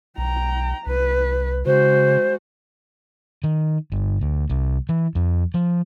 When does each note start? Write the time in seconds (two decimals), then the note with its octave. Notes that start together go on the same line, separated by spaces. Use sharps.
0.17 B1 G5 A#5
0.86 C2 B4
1.66 C#3 G#3 F#4 C5
3.44 D#3
3.92 G1
4.21 D2
4.50 C2
4.89 E3
5.15 F2
5.54 F3